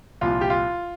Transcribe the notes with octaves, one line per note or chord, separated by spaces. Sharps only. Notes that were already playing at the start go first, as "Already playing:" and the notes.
C2 A#2 F3 F4
G4
F4